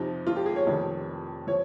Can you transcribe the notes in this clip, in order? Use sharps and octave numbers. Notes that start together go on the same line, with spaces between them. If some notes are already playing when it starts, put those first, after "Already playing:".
Already playing: F2 C3 F3 D#4
F4
G4
G#4
C#5
F1 F2 D#3 G3
F3 C#5